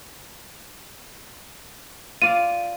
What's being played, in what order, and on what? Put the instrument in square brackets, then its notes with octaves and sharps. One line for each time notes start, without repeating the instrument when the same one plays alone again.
[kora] F4 D5 F5 [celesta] D#7